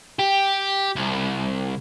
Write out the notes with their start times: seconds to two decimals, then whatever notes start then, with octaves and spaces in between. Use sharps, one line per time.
0.19 G4
0.96 C2